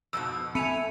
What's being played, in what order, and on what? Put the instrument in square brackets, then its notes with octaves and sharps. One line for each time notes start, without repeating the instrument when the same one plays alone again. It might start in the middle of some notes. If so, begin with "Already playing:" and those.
[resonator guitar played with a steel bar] F2 G#2 B2 [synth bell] E6
[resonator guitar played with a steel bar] A3 [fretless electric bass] C4 [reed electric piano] G#5 B5 [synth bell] C#7 D#7 F7